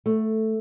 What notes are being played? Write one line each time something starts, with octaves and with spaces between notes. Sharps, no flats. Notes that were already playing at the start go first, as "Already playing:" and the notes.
A3